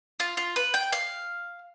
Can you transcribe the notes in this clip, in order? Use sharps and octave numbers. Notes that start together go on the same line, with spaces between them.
F4
F4
B4
G5
F5